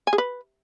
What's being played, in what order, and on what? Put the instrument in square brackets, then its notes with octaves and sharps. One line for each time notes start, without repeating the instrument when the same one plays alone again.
[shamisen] G#5
G#4
B4